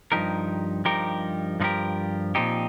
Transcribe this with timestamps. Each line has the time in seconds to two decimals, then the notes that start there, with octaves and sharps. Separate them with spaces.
0.12 G2 F3 D#4 G4 A#4
0.85 G2 F3 D#4 G4 A#4
1.60 G2 F3 D#4 G4 A#4
2.35 A#2 F3 C4 D#4 G4